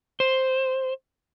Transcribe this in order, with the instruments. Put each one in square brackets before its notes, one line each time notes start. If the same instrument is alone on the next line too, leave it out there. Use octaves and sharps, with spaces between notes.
[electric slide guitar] C5